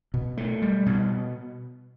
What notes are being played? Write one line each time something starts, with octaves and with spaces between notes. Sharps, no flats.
B2
A3
G3
B2